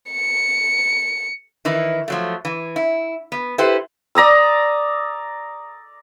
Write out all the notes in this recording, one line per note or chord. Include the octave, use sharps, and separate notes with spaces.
C#7
D#3 E3 E4
F3 F#3 A3
E3
E4
B3
E4 G4 A4 B4 C5
D5 A#5 D#6 E6